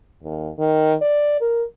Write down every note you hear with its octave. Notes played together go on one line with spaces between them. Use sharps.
D#2
D#3
D5
A#4